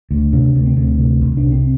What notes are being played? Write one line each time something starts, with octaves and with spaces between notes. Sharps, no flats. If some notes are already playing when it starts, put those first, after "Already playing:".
D2
C3 D4
D2
C4
D2
C3
C2
D4
C3
C4